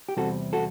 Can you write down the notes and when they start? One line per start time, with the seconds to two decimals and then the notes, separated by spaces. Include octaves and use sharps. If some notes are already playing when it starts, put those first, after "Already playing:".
0.09 G4
0.17 E2 C3 G3 C4 F#4 A4
0.53 F#4 A4